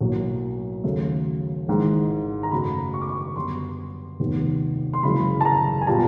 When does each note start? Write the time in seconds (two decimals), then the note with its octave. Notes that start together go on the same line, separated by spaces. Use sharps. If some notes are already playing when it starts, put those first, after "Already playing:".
0.01 B1 A2 F#3 A#3
0.84 D#2 C#3 F#3 A3
1.68 G#1 G#2 E3 G#3
2.43 A#5
2.52 F#2 C#3 F#3 A3 B5
2.94 C#6
3.02 D6
3.09 C#6
3.35 F#2 D3 G3 B3 C6
4.20 F1 D#2 D#3 G3 B3
4.94 C6
5.03 F#1 F#2 C#3 E3 G#3 B5
5.41 A5
5.45 A#5
5.81 G#5
5.87 A#2 G3 B3 A5